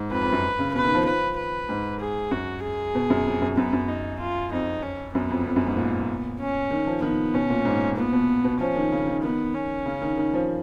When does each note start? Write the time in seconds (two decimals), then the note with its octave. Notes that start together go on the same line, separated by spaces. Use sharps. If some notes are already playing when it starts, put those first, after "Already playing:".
Already playing: G#2
0.11 F2 B4
0.21 F2
0.32 F#2
0.59 C#3
0.74 B2 B4
0.84 D#3
0.95 F3
1.05 F3 B4
1.37 B4
1.69 G#2
2.00 G#4
2.31 F#2 F#4
2.63 G#4
2.95 B2
3.10 F#2
3.26 F2
3.42 F#2
3.57 F#2 B3
3.73 F#2
3.88 D#4
4.20 F4
4.52 F2 D#4
4.82 C#4
5.14 F#2 B3
5.31 F2
5.46 F2
5.56 F#2
5.66 G#2
5.77 A#2
6.40 C#4
6.71 D#3
6.87 F3
7.02 D#3 B3
7.34 B2 C#4
7.50 A#2
7.65 G#2
7.97 A#2 B3
8.12 B2
8.44 B2
8.60 F3 C#4
8.76 D#3
8.92 C#3
9.07 D#3
9.23 D#3 B3
9.54 C#4
9.86 C#3
10.02 D#3
10.17 D#3
10.34 F3